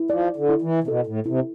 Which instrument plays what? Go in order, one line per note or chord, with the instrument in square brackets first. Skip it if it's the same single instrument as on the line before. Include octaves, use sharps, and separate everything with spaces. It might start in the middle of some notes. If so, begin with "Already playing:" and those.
Already playing: [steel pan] E4
[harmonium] F3 [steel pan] D5
[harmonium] D3
[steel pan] E4
[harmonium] E3
C3
[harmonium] B2 [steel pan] A4
[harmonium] A2
[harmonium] C3 [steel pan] E4